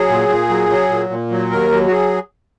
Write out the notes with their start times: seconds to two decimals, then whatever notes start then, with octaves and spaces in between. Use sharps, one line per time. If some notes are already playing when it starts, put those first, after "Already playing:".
Already playing: F#3 G#4
0.09 A#2
0.29 A#2
0.50 F#3
0.70 F#3
0.90 A#2
1.10 A#2
1.31 F#3
1.50 D#2 A#4
1.71 F#3
1.87 F#4
1.91 G#4